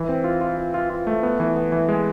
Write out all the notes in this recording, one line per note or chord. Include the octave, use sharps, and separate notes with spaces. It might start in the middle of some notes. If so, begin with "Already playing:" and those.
Already playing: E3
C4
F4
F4
F4
F4
F4
A3
B3
E3
B3
E3
G#3